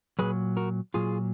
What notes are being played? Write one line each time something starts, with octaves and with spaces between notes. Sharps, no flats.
A#2 F#3 G#4 B4
F#4 A#4
A#2 F#3 F4 G#4